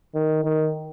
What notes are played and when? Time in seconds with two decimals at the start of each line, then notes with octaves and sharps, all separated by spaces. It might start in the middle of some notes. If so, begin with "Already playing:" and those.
0.14 D#3
0.44 D#3